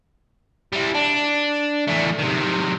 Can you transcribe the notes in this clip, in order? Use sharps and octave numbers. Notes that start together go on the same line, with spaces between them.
G3 E4
D4
E2 A3
C3 D#3